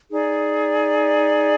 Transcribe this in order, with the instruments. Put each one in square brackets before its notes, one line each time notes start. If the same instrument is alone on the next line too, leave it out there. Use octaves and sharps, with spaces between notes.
[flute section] D#4 G#4 D5